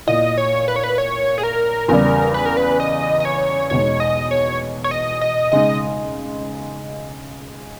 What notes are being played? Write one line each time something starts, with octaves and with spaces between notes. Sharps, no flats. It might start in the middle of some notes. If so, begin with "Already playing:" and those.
A#2 A#3 E4 D#5
C#5
B4
C#5
B4
C#5
G#4
A#4
E2 C#3 G3 A#4
B4
A#4
B4
D#5
D#5
C#5
E2 B2 G#3 D#4 C#5
D#5
C#5
C#5
D#5
D#5
C#3 G#3 D#4 D#5